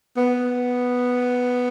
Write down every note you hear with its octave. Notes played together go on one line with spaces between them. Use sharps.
B3